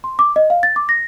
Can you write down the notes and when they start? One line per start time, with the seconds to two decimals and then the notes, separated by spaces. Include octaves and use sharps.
0.04 C6
0.19 D6
0.36 D#5
0.50 F5
0.63 A6
0.76 D6
0.89 A#6